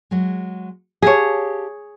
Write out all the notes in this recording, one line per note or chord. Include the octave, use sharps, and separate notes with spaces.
F#3 G#3
G4 G#4 C#5 F5 A5